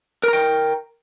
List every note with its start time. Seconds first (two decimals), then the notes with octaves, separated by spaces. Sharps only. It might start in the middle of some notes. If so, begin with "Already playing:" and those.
0.23 A#4
0.28 A#5
0.33 G5